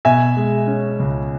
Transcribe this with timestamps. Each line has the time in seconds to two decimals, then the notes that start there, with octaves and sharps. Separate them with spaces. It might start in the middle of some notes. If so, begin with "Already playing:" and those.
0.05 B2 E5 G#5
0.37 G#3
0.67 C#4
0.99 C#2